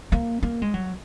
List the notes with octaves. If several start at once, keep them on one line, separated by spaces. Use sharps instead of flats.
A#3
A#3
G#3
F#3